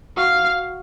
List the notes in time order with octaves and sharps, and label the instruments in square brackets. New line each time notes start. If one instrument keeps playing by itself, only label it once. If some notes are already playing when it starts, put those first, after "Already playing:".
[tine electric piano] F#4 [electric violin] F5